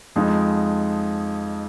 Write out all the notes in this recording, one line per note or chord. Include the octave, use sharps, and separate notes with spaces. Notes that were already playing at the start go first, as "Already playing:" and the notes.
F2 F3 G#3 D#4